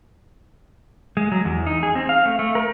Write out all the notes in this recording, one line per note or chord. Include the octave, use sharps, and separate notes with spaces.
G#3
F#3
E2
D#4
G#4
C4
F5
A3
A3
A#4